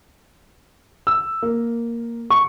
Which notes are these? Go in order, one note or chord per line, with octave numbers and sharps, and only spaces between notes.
E6
A#3
C#6